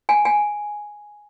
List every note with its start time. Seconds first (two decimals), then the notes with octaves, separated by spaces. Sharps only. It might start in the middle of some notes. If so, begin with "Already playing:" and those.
0.09 G#5
0.25 G#5